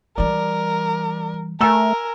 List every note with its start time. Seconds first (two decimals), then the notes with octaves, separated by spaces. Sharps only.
0.18 E3 G3 A#4 D5
1.61 A3 A#4 G#5 A#5 E6